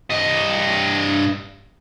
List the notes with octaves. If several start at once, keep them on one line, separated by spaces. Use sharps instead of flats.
G2 D#5